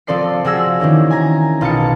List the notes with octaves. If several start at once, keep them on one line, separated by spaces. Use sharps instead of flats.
F3 C4 A4 D5 C7
F3 F#4 G#4 E6 A#6
D#3 E3 A#3 C#4
G#5 A#5
B1 F4 A5 D#6 C#7